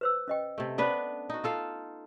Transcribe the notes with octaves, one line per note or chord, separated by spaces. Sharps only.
B4 C5 E6
C#4 D#5 G5
C3 A3
B3 C#4 D4 B4 C5
D#4 F#4
F4 A4 F5